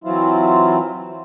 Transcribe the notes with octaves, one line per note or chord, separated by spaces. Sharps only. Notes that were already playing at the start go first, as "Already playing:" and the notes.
E3 F#3 C4 E4 F4